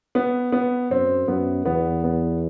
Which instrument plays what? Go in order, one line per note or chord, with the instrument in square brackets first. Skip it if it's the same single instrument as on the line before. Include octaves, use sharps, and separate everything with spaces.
[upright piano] B3
B3
[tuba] F#2 [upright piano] C4
[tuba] F#2 [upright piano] B3
[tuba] E2 [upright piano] B3
[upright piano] B3